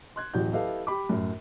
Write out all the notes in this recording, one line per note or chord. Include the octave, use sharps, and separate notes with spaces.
C6 F#6 G#6
D1 A1 F#4 G4 F#5 G6
E4 G4 A4 B4 D#5 F5
G4 B5 D6
F#2 A2